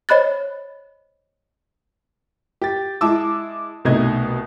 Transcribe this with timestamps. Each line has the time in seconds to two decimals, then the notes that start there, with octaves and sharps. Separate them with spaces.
0.09 C5 C#5 D#5 B5 F#6 A6
2.62 G4 A6
3.01 G#3 E4 A5 D6 E6
3.85 C2 B2 A3 D#4 D#5 G#6